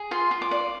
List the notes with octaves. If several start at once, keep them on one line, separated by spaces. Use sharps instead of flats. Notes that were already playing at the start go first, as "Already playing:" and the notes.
Already playing: G#4
F4 C6
F4
D6
D5